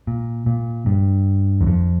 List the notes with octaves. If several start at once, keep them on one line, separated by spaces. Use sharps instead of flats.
A#2
A#2
G2
E2
F2